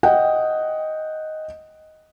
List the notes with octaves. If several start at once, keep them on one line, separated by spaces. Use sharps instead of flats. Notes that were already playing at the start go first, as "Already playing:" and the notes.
D#5 F#5 G5